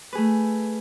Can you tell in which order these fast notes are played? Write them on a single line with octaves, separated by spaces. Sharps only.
B4 G#4 A3